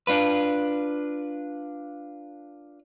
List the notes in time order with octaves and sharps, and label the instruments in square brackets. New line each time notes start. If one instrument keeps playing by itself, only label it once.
[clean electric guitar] D4 F4 B4